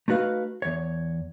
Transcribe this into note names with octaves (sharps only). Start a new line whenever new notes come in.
A3 D#4 F#4 B4 F5
E2 C#5